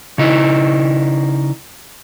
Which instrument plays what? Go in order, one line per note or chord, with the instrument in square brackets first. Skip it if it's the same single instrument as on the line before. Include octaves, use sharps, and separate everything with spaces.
[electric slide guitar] C#3 D#4 E4